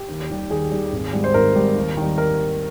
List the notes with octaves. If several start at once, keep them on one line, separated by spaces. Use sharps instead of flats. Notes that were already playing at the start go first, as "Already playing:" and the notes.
Already playing: G4
D#2
D#3 G3
D#2 G#4
D#3 G3
G#1
G#2 G3
C5
G#1 A#4
G#2 G3
D#2
D#3 G3
A#4